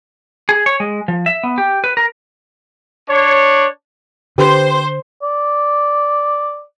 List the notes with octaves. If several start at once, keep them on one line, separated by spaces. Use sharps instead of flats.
G#4
C#5
G#3
F3
E5
B3
G4
B4
A#4
D4 C#5
D3 G4 B4 C5
D5